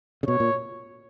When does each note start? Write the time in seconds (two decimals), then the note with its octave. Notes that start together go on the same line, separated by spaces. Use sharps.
0.23 C#3
0.28 B2 C#5
0.40 A#2